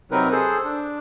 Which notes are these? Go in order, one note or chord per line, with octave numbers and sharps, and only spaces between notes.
C3 F#3 C4 D#4 A#4 B4
G#4 A4 C5
D4